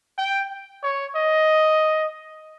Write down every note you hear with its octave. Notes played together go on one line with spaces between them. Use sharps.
G5
C#5
D#5